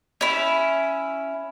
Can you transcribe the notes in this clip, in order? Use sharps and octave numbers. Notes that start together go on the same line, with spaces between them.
C#4 E4